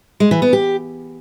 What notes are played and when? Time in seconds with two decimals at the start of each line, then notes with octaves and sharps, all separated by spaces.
0.20 G#3
0.31 E3
0.42 B3
0.53 G4